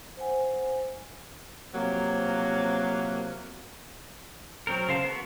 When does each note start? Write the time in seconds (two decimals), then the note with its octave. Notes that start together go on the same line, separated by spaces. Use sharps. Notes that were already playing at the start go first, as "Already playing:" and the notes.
0.17 C5 F#5 G#5
1.74 C3 F3 F#3 A#3
4.67 F#3 C4 A#4
4.88 C#3 A#4 C5 F5 A5
5.04 B3 F#4